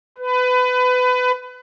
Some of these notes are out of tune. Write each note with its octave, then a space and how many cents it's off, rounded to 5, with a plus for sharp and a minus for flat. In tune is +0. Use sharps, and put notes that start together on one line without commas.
B4 +25